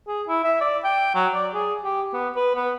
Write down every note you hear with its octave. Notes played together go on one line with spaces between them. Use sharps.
G#4
E4
E5
D5
G5
F#3
D5
G#4
G4
B3
B4
B3